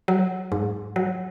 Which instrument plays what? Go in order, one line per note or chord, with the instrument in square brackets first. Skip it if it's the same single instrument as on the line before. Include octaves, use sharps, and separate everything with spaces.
[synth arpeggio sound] F#3
G#2
F#3